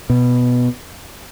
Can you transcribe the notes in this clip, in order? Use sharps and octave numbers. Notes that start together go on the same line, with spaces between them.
B2